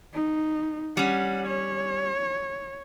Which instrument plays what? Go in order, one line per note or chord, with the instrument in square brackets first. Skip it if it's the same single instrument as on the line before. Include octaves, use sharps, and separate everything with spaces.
[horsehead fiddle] D#4
[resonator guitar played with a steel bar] G3 C#4 [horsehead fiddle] F#5
[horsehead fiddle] C#5